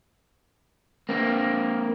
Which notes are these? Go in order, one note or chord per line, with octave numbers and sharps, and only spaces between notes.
A#3 C4